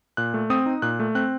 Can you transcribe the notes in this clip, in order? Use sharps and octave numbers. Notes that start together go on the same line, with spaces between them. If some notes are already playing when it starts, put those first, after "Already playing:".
A#2 F#6
A3
C4 D#6
D#4
A#2 F#6
A3
C4 F#6